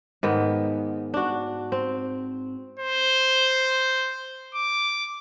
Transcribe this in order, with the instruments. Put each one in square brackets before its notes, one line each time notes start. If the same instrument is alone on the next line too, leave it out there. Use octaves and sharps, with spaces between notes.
[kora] G#2 D#3 B3
D4 F#4
C4
[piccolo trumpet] C5
D6